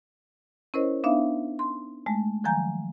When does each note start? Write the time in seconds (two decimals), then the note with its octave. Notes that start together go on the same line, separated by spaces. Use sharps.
0.74 C#4 E4 A#4 C5 C#5 D#5
1.04 B3 D4 D#4 E5 F5
1.59 C6
2.06 G#3 A3
2.44 D#3 F3 F#3 G#5 A#5 G6